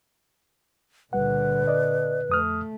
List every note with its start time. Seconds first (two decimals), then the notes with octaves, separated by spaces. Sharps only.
1.13 C#2 A#2 D3 G3 B4 F#5
1.67 D5 D#5
2.29 F2 A3 D#6 F6